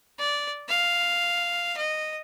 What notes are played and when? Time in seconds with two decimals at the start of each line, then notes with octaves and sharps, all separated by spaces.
0.19 D5
0.69 F5
1.77 D#5